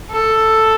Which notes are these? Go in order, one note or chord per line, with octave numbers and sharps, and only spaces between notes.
A4